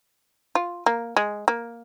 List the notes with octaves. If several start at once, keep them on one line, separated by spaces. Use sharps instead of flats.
F4
A#3
G#3
A#3